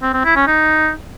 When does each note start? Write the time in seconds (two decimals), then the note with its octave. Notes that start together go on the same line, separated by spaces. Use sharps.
0.02 C4
0.13 C4
0.25 E4
0.36 C#4
0.47 D#4